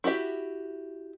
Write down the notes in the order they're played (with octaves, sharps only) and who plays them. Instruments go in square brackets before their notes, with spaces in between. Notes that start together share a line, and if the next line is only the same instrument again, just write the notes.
[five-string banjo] E4 F#4 G4 E5